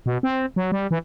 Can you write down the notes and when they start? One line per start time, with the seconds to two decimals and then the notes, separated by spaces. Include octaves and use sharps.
0.06 B2
0.23 C4
0.56 F#3
0.72 G3
0.91 E3